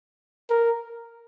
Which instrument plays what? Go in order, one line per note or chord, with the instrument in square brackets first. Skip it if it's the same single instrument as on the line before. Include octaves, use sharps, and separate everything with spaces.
[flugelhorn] A#4